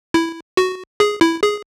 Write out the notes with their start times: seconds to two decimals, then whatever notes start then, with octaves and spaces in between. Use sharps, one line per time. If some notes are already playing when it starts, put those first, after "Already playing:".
0.14 E4
0.57 F#4
1.00 G#4
1.21 E4
1.42 G#4